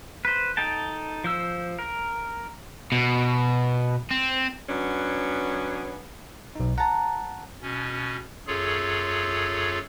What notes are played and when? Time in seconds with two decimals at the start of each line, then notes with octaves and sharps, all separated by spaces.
0.25 B4 C5
0.57 D#4 A4 G5 A5
1.24 F3 C5 E6
1.79 A#4
2.92 B2
4.11 C4
4.69 F#3 B3 C#4 D4
6.56 B1 D#4
6.78 F#5 A5 A#5
7.62 B2 C#4
8.47 F#2 F4 G#4 A4 C#5